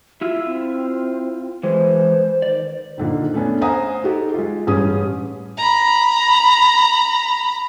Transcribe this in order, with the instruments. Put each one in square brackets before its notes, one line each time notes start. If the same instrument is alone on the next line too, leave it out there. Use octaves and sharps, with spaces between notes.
[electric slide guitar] E4 F4 [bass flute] E5
[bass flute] C4
[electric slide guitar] E3 G#3 [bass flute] B4 [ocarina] C5
[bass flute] D#3 [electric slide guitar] D5
[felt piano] A#2 D3 D#3
A3 B3 C#4 D4
C5 F5 F#5 G#5 A#5 D#6
D#4 F#4 G4 A4
G#3 F4
A1 G2 C#4 G4 G#4 D#6
[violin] A#5 B5